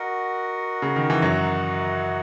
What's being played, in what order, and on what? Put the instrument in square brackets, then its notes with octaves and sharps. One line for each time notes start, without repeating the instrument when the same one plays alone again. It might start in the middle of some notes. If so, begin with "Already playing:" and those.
Already playing: [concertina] F#4 A#4 D#5 F#5
[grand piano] C#3
D#3
E3
F#2 F#3